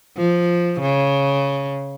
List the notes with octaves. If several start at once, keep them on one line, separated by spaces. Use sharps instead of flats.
F3
C#3